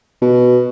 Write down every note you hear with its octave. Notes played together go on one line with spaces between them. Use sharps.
B2